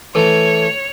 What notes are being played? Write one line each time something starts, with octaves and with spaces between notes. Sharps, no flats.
E3 A3 C#5